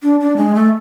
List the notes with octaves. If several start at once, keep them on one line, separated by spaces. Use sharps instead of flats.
D4
D4
G#3
A3